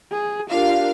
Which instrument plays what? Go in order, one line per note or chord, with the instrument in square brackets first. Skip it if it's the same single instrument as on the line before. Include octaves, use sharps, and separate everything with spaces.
[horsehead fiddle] G#4
[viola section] D4 G4 A#4 [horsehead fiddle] F4 [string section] F5